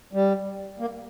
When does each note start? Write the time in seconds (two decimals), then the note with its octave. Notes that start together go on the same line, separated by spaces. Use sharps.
0.13 G3
0.79 A#3